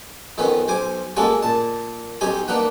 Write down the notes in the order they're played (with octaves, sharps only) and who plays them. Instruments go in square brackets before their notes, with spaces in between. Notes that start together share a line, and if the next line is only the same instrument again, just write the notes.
[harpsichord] F2 D#3 B3 C#4 B4
B1 C5 G#5 D6
G#3 A#3 C#4 F#4 A4
A#2 A5
B1 C#4 D#4 G4 G#5
A#3 D4 D#4 B4 F#5